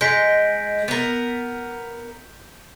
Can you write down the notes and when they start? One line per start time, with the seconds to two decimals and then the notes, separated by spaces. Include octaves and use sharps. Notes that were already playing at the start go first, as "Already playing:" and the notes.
0.01 G#3 G6 B6 D7
0.88 B3 A#4